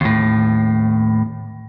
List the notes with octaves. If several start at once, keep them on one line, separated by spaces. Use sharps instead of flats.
D#2 A2